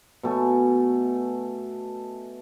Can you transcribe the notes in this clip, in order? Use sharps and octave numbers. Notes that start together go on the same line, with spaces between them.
B2 A3 G#5